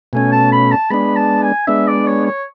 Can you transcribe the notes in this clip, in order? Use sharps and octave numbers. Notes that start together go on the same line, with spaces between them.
B2 A3 C#4 G#5
A5
B5
A5
G#3 B3 D4 B5
A5
G#5
G#3 B3 D4 E5
D5
C#5
C#5